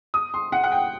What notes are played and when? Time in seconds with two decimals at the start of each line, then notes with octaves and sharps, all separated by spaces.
0.14 D#6
0.34 C6
0.52 F#5
0.64 F#5
0.72 G5